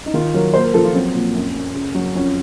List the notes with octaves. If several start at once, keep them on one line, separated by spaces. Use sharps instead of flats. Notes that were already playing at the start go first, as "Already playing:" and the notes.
D#4
D#3 F4
F#3 A#4
A#2 C5
A#4
F3 A4
F4
F#3 C4
A#2
F#2
F#2
C#3
F#3
F2 C#4